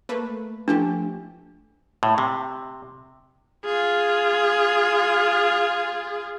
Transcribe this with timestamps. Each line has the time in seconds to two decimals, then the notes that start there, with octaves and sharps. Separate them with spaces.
0.09 A3 A#3 B4
0.68 F3 A3 D4 G4
2.03 A2
2.18 C3
3.64 F4 G#4